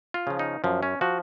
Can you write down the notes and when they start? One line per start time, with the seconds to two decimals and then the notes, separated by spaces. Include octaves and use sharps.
0.14 F4
0.27 C#3 F3
0.39 D#4
0.64 F#2 F3
0.83 C#4
1.01 F3 F#4